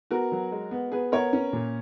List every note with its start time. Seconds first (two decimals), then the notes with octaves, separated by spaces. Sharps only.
0.11 B3 F#4 A#4
0.32 F#3
0.52 G#3
0.71 B3
0.92 B3 G#4 B4
1.12 B3 A#4 C#5
1.33 C#4
1.53 A#2